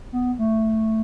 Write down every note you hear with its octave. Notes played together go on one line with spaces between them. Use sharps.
B3
A3